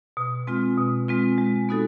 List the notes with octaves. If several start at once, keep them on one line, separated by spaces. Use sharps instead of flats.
B2
G#3 C4 F4
B2
G#3 C4 F4
G#3
B3 D#4 F#4 A4